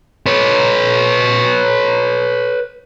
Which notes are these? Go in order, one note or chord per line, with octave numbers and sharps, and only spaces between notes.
B4 C#5